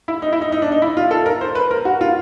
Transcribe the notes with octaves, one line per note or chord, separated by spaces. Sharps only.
E4
D#4
E4
D#4
D#4
D4
D#4
E4
F4
A4
A#4
C5
B4
A#4
F#4
F4